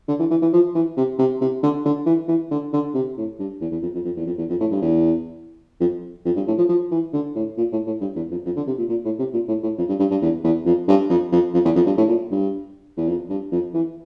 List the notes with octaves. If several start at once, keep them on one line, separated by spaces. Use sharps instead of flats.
D3
E3
E3
E3
F3
E3
C3
C3
C3
D3
D3
E3
E3
D3
D3
C3
A2
G2
E2
E2
F2
F2
F2
E2
F2
E2
F2
A2
G2
E2
F2
F2
G2
A2
F3
F3
E3
D3
A2
A#2
A2
A2
G2
E2
F2
F2
D3
C3
A#2
A#2
A2
C3
A#2
A2
A2
F2
G2
G2
G2
E2
E2
F2
G2
F2
F2
F2
E2
F2
G2
A2
A#2
G2
E2
F2
G2
F2
E3